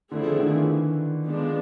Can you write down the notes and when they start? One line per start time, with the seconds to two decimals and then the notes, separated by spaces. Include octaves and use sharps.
0.11 D3 F3 A3 C4 E4 G#4
0.25 D3
0.40 D#3
0.55 E3
1.26 F3 G#3 B3 D4